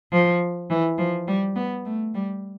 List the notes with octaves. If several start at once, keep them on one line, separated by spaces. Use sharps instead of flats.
F3
E3
F3
G3
B3
A3
G3